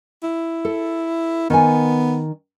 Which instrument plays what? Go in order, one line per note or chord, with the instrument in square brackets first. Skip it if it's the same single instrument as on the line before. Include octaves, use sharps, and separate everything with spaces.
[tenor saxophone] E4
[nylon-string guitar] A4
[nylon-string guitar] D#3 G#5 [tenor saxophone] B3